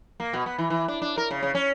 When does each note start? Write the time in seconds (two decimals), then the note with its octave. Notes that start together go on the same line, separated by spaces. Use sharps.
0.20 A#3
0.33 B2
0.46 B3
0.58 E3
0.70 E3
0.88 D4
1.02 D4
1.18 A#4
1.31 C#3
1.43 C#3
1.55 C#4